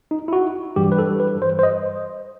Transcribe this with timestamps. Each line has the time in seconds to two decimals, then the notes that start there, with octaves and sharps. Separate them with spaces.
0.11 D#4
0.28 E4
0.33 F#4
0.76 G2 E3 G3 G4
0.92 B4
0.98 A4
1.20 B4
1.42 C5
1.59 C5
1.63 D#5